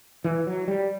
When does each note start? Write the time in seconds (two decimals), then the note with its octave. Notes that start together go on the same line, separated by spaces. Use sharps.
0.24 E3
0.47 F#3
0.68 G3